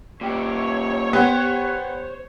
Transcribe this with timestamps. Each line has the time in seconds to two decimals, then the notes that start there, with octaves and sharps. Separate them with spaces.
0.21 A#2 G4 C#5
1.13 B3 G4 C5